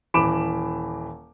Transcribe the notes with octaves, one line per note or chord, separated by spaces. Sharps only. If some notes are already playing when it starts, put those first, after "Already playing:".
D#1 E3 B5 D6 D7 E7